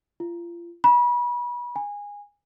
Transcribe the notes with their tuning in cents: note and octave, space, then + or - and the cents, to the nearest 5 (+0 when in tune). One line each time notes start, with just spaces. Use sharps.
F4 -30
B5 -30
G#5 -20